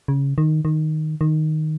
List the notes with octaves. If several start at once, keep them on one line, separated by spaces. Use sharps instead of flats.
C#3
D#3
D#3
D#3